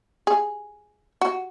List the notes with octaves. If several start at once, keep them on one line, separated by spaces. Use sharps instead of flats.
G#4
F#4